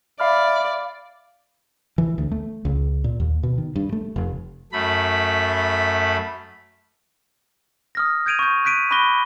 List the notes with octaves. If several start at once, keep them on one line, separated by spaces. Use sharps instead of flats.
D5 E5 F5 B5 F6
E3
D2
A3
C#2
A#2
D#2
B2
D#3
G2
A3
F1
F#2 A3 B5
D#6 F6 A#6
G6 G#6 D7 D#7 F7
C#6 G6
F#6 G6 B6 D7 D#7
B5 C#6 D6 F#6 A#6 G7